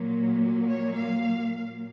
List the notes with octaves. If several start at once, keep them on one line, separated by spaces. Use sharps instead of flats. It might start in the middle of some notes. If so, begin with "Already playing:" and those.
Already playing: A#2 F#3 A#3
C#5
F5